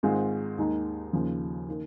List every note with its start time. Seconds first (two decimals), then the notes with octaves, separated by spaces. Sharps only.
0.03 G#2 D#3 G#3 C4 F4
0.58 D#2 D#3 G#3 D#4
1.13 D#2 C#3 F3
1.69 D#3 A#3